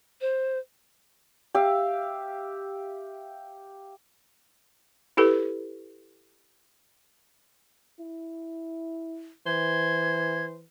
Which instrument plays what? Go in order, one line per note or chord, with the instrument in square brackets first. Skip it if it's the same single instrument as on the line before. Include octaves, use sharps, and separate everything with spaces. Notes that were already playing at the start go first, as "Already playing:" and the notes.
[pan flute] C5
[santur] G4 E5 F5
[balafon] E4 G4 A4 B4
[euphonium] E4
[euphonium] E3 [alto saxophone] C5 [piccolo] G#6